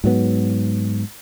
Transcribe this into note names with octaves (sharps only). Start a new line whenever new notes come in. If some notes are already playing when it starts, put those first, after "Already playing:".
G#2 F#3 B3